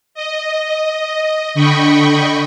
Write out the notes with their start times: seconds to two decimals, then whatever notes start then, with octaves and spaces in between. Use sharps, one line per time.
0.14 D#5
1.54 D3 D#5 G5 B5 C#6